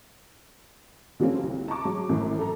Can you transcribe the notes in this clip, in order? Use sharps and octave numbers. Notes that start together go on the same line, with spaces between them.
D3 F3 G3 A#3 C4 C#4
C2
A5 A#5 C#6 D6
F#3 G#3
G#1 F#2 A2
A4 A#5